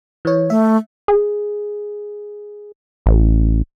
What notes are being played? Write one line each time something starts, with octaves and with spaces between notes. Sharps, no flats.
E3 C#5
A3 E5
G#4
A1